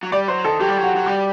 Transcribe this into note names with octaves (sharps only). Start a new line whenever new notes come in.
F#3
G3 D5
F#3 C5
D#3 A4
F#3 G4
G3
F#3
F#4
F#3
G3 G4